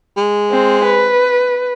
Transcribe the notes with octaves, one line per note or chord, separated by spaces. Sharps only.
G#3
C4
B4